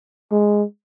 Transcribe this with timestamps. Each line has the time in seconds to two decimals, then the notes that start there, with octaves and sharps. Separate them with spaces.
0.31 G#3